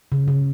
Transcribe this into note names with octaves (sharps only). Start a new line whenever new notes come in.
C#3
C#3